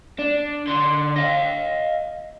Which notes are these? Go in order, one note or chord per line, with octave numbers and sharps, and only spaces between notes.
D4
D3 C6
D#5 F5